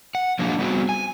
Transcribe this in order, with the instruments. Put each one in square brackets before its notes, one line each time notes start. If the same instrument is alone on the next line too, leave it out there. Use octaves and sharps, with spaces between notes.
[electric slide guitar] F#5
F3 F#3 G#3 A#3 D4
G3 B3 C4 F#4
G#5